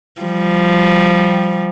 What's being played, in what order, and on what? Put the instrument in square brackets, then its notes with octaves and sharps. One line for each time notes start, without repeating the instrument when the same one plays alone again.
[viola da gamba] F3 G3